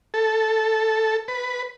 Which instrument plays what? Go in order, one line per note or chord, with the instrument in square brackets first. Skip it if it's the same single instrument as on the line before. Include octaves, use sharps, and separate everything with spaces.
[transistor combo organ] A4
B4